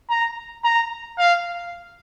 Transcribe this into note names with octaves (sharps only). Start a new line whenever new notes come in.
A#5
A#5
F5